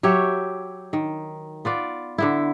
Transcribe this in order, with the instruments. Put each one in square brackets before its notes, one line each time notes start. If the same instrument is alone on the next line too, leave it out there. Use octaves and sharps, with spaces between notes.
[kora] F#3 G4 C#5 E5
D#3
B3 F4 D5
D3 B3 E4